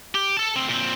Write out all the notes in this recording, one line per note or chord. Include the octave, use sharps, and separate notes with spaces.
G4
A4 A5
D2 C4
A#2 C4